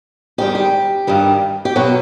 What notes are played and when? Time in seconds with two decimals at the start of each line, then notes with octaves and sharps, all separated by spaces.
0.38 G#2 D#3 G3 G4
0.55 G4
1.07 G2 D#3 G3
1.65 G4
1.76 B2 F#3 F#4